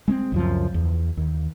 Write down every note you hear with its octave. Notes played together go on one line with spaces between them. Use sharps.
G#3 B3 C4
C#2 F#2 F3
E2
D#2